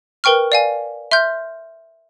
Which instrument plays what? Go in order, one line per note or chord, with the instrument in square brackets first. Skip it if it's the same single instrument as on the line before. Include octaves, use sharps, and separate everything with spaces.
[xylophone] A#4 B4 G5 C#6 F6
D5 F5 G#5
E5 C6 F6 G6